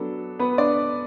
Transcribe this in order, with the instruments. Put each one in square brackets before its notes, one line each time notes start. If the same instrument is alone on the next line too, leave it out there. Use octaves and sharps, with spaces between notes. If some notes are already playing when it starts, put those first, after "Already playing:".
Already playing: [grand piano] F#3 B3 D4 A4
B3 B4
D4 D5